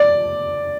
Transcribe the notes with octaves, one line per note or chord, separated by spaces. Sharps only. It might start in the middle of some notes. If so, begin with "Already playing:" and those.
Already playing: D5